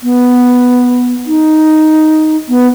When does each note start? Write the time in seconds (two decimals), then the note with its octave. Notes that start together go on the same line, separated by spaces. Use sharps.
0.03 B3
1.26 D#4
2.49 B3